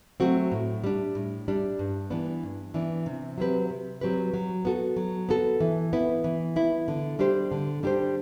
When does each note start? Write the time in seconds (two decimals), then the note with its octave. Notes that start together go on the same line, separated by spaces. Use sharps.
0.20 F#3 A3 C4 F#4
0.52 A2
0.84 G3 D4
1.15 A2
1.48 G3 D4
1.79 G2
2.10 E3 B3 D4
2.43 G2
2.74 E3 B3 D4
3.06 C3
3.38 F#3 C4 G4 B4
3.70 C3
4.01 F#3 C4 G4 B4
4.34 F#3
4.65 B3 F#4 A4
4.96 F#3
5.29 B3 F#4 A4
5.60 E3
5.93 B3 E4
6.24 E3
6.56 B3 E4
6.88 D3
7.19 G3 D4 G4 C5
7.52 D3
7.83 G3 D4 G4 C5